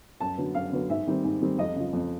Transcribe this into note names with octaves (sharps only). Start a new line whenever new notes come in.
F#2 A5
D3 F#3 B3
F#2 F5
D3 F#3 B3
G#2 E5
D#3 G3 C4
G#2
D#3 G3 C4
F2 D#5
C#3 F3
F2